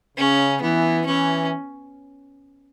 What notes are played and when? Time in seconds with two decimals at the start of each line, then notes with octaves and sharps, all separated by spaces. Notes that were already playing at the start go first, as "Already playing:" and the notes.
0.18 C#3 C#4
0.62 E3 B3
1.06 E3 C#4